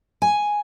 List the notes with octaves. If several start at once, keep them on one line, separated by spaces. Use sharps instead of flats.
G#5